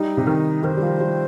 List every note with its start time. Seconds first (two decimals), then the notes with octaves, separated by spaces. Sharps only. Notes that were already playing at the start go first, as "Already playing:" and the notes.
Already playing: G3 D#4
0.17 C3
0.27 D#3
0.64 D#3 C5
0.77 G3
0.82 F3
1.00 G3